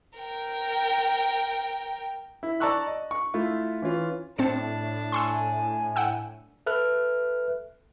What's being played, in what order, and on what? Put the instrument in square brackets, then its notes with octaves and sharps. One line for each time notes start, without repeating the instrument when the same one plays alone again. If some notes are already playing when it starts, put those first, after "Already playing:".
[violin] A#4 G5
[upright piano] E4
D5 A5 A#5 C#6 E6 F#6
D#5
C#6
A3 E4 F4
E3 C#4 F4
[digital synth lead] A2 [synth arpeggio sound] C4 A5 C#7 [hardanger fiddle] D4
[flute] G#5 [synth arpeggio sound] C6 C#6 E6
[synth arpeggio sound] F#5 G5 E6
[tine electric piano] A4 B4 E5 F6 F#6